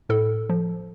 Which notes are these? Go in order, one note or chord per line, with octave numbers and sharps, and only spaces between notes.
A2 A4
F3